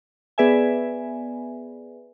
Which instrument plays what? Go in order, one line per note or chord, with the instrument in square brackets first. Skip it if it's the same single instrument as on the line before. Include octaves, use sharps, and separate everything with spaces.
[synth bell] B3 G#4 B4 D5 E5 G#5